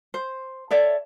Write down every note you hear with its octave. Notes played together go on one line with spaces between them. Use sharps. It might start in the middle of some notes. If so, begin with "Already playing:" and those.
C5
A4 C#5 D5 E5